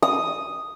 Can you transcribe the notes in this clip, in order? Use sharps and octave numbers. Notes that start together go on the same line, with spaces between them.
D#6